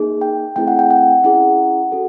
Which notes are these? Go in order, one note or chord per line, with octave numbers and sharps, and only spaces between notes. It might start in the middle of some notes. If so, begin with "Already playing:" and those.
Already playing: A#3 D#4 G#4
G5
A3 C4 E4 G#4 G5
F#5
G5
F#5
C#4 E4 G#4 F#5
C#4 F#4 A4